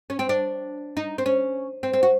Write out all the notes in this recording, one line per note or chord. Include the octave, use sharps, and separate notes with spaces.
C#4
C4
D4
D#4
C4
C#4
C4
C4
F#4